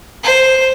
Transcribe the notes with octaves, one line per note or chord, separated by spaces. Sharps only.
C5